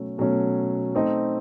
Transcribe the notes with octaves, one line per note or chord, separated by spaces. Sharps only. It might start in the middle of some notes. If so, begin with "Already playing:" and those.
Already playing: B2 F#3 A3 C#4
B2 F#3 A3 C#4
A3 C4 D#4